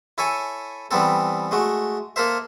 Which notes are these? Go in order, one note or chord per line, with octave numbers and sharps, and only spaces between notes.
E4 A4 C#5 G#5
E3 G3 B3 C4 A4
G#3 A3 F#4
A#3 A4 A#4 C5 E5